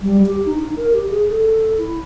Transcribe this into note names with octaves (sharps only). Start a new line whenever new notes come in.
G3
G4
D#4
D#4
A#4
G4
G#4
A4
E4